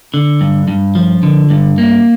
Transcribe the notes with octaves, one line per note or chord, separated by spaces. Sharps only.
D3
G2
G2
F3
D3
G2
A#3